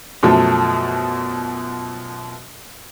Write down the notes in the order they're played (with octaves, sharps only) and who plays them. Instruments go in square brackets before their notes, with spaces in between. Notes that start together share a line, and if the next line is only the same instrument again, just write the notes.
[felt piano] F#2 B2 F3 A3